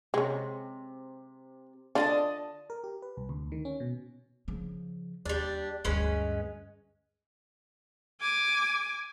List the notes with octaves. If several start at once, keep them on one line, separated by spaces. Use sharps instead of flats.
C3 G#3 C#4
D3 D4 F4 D5 D#5 A5
A#4
G4
B4
C2
D2
D#3
C#4
B2
C#3 F3
D#2 G3 D4
D2 G2 G#3 C#4 B4
G#5 D6